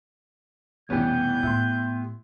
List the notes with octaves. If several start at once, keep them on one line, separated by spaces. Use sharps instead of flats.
F1 B1 E3 G3 B3 C#4 G4 G6
A2 E4 C6